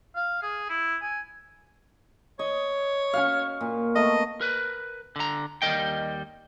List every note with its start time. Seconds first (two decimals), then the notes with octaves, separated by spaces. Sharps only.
0.15 F5
0.42 G#4
0.69 E4
1.02 G#5
2.39 C#5 D#5
3.13 C#4 F#4 F5
3.61 A#2
3.95 A3 B3 D#5
4.41 A#4 B4
5.16 D3 A#5
5.62 D#2 G3 A#4 D#5 G5